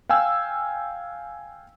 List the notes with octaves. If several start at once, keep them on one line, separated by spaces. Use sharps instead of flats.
F5 G5 G#5 E6